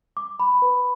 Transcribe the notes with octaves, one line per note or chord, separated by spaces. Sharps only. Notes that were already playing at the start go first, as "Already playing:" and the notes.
D6
B5
B4